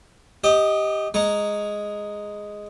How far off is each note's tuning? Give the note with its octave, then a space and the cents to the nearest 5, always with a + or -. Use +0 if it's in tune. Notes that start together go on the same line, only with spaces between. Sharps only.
G4 +0 D#5 +15 D#6 -45
G#3 +0 A#5 +0 C#6 +0